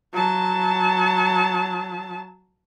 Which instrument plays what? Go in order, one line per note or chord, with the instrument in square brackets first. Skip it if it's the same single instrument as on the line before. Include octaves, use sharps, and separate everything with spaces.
[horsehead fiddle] F#3 A5